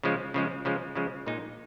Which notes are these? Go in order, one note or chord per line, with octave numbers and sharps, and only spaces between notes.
C#3 F3 G#3
C#3 F3 G#3
C#3 F3 G#3
C#3 F3 G#3
A#2 G#3 D#4